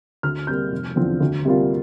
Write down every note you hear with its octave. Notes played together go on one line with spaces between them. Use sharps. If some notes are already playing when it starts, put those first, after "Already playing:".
D2 F6
C3 G3 A#3 G6
F1
E2 D3 F3 C4
D2
C3 G3 A#3 F4